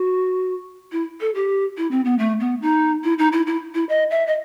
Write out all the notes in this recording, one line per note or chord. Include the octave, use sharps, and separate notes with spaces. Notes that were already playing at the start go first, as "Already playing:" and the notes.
Already playing: F#4
E4
A4
G4
E4
C4
B3
A3
B3
D#4
E4
D#4
E4
E4
E4
D#5
E5
D#5